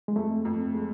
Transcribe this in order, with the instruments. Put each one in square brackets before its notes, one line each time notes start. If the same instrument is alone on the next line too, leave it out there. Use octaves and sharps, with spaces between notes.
[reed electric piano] G#3
[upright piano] F2 [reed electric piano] A3
[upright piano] F2
G#3